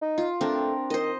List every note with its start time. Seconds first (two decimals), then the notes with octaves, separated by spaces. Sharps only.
0.01 D#4
0.18 F4
0.41 A3 C4 D4 A#4
0.90 D#3 C5 D#5